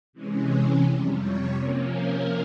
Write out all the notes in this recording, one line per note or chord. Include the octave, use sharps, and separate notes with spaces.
C3 E3 G#3 C#4
F2 C3 G3
C#5
C3 F3 A#3 C#4
A#4